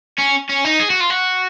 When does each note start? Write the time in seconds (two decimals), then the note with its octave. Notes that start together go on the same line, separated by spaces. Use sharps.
0.19 C#4
0.50 C#4
0.65 D#4
0.80 G#4
0.90 F#4
1.00 F4
1.10 F#4